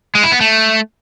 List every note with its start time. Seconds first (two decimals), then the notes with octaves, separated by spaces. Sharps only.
0.15 G#3
0.24 E4
0.32 B3
0.40 A3